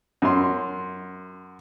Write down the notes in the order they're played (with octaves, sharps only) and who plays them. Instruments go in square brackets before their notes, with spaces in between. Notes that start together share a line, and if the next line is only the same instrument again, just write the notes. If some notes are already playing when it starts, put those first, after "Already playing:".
[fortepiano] F#2 C6